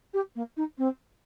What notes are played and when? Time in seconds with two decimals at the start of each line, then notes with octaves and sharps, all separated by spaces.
0.13 G4
0.35 A#3
0.57 D#4
0.78 C4